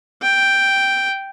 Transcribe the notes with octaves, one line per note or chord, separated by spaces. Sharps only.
G5